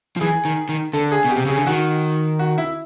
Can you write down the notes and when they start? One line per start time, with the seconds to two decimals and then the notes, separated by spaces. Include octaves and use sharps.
0.17 F3
0.21 E3 G#4
0.45 D#3
0.69 D#3
0.93 D3 A4
1.12 G#4
1.25 B2
1.30 G4
1.35 C3
1.46 C#3 G#4
1.56 D3
1.66 D#3 F#4
2.39 F#4
2.58 E4